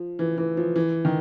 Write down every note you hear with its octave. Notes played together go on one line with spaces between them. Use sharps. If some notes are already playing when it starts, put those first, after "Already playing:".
Already playing: F3
E3
E3
F3
E3
D#3